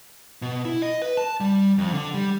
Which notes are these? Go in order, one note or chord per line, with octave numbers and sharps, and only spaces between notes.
B2
E4
D#5
B4
A5
G3
F2
D3
G3